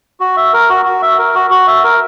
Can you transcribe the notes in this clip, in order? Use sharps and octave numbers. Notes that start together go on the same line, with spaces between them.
F#4
E5
A#4
F#4
F#4
E5
A#4
F#4
F#4
E5
A#4